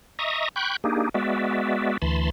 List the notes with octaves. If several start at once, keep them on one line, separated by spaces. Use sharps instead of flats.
D#5 E5 A#5 C#6 D#6
G5 B5 C#6 F#6 G6
A#3 D4 D#4 G4 G#4
G#3 B3 F#4 D5 E5
D2 E3 A5 B5 C6